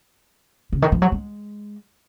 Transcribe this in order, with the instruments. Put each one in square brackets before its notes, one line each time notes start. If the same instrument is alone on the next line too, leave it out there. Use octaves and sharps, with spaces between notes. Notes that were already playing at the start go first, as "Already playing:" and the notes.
[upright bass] C#3
D#3
F3
F#3
G#3